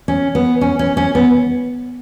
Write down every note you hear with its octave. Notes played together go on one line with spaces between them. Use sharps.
C#4
B3
C#4
C#4
C#4
B3